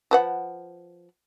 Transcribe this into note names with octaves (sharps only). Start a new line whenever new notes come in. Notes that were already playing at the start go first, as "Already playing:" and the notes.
F3 B4 F#5